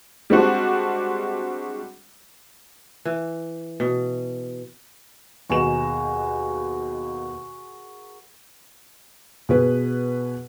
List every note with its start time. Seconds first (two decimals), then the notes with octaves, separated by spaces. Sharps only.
0.30 G3 G#3 C4 D4 F#4
3.05 E3
3.80 B2
5.50 D#2 B2 F#4 G#4 A#4 E7
9.49 B2 G#4 B4